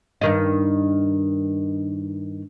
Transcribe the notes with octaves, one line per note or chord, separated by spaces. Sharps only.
G2 D#3 D#5